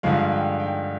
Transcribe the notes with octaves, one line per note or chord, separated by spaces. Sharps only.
G2 D3 F3 G#3 F5
G5
G5